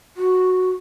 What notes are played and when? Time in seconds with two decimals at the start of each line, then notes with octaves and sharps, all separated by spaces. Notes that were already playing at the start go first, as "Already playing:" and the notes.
0.17 F#4